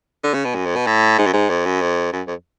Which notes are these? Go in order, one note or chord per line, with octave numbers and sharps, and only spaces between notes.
D3
C#3
B2
F#2
F2
B2
A2
G#2
F#2
G#2
F2
F#2
F2
F#2
F2